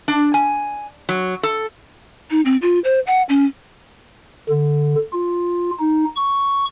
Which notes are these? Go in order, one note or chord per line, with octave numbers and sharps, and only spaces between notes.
D4
G#5
F#3
A4
D#4
C4
F4
C5
F#5
C#4
D3
F4
D#4
C#6